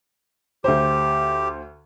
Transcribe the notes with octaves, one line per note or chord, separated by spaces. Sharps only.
D2 G4 C5